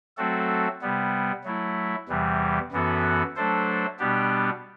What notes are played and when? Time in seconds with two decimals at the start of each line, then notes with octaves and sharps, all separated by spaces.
0.17 F#3 A3 C4 F#4 A4
0.81 C3 G3 B3
1.44 F#3 A3 E4
2.08 E2 C3 E3 G3
2.72 F#2 E3 B3 F#4 A4
3.36 F#3 A3 D4 A4 C5
3.99 B2 G3 B3 D4 G4